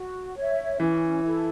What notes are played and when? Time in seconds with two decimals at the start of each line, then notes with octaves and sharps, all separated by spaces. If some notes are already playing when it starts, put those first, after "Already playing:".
Already playing: F#4
0.37 C#5 E5
0.80 E3 C#4
1.23 E4 A4